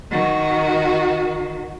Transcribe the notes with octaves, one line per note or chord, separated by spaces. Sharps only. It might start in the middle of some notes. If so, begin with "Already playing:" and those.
D#3 F#4